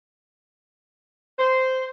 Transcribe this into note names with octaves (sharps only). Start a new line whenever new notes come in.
C5